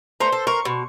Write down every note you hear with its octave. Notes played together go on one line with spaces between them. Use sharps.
A3 C5 A#5
A4
A#4 C#6
B2